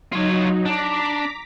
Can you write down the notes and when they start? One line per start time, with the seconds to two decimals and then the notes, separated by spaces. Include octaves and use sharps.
0.12 F#3 D#4 F4 C#5
0.66 D4 A#5 D6 B6